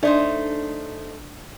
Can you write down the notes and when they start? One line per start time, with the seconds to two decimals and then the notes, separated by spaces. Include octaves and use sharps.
0.03 A3 D4 D#4 C5 D5